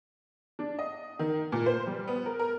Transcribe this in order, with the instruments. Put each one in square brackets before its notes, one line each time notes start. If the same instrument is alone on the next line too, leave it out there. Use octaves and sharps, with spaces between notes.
[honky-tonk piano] D4
D#5
D#3
A#2
C5
G3
B3
A#4
A#4